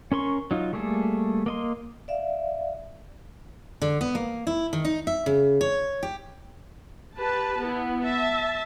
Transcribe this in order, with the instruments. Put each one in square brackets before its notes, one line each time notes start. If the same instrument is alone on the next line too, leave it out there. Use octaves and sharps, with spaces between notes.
[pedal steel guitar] C#4 A#4 C6 C#6
F#3 D#4 F4
G3 A3 A#3 G#4 A4
A#3 D#5 C6
[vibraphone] D5 E5 F5
[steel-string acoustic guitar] D3
B3
A#3
E4
D#3
D#4
E5
C#3
C#5
G4
[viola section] G4 B4 A5
B3 E4
E5 A5